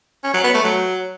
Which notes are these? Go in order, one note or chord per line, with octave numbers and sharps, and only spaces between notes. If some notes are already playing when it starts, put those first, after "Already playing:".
C#4
F#3
B3
A3
F#3